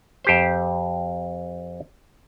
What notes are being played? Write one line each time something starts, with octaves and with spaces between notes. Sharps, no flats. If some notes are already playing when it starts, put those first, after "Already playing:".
F2 G4 C5